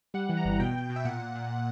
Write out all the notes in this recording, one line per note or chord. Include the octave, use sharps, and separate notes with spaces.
G3 F#5
E3
A#5
G1
B2 G5
B2
B2
E5
A#2 F#5
A#2
A#2